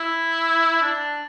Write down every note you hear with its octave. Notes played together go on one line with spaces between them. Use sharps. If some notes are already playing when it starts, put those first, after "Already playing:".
Already playing: E4
D4